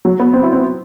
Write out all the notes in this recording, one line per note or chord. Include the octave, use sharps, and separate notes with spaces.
F#3
B3
C4
E4
C4